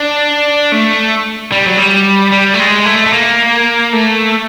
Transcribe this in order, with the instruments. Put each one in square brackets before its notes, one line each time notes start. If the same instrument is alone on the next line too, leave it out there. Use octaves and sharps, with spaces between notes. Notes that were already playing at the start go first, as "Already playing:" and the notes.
Already playing: [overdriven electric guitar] D4
A3
G3
F#3
G3
G3
A3
G#3
A3
A3
A#3
A3